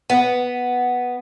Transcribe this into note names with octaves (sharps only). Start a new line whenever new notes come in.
B3